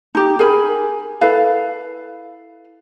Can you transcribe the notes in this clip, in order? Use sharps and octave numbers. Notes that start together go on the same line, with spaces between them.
D#4 G4
G#4 A#4 G#5 B5
E4 A4 B4 F5